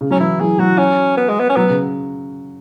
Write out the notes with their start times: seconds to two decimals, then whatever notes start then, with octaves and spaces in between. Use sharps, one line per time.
0.01 C#3
0.10 F#3 C#4
0.20 E3 E4
0.40 F#3 G#4
0.59 F#3 F#4
0.78 C#4
1.17 B3
1.29 G#3
1.40 B3
1.49 C#4
1.56 F#3 B3
1.70 C#3